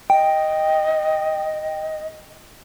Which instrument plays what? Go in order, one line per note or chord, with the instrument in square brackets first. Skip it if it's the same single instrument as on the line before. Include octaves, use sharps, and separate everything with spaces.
[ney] D#5 [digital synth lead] G5